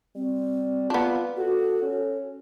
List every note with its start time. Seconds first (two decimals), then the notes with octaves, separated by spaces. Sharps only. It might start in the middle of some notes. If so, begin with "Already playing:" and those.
0.16 G3 C4
0.90 B3 D4 F4
1.37 F#4 A4
1.82 C#4